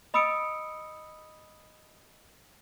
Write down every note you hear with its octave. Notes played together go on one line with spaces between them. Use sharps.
D#5 B5 D#6 E6 C#7 D7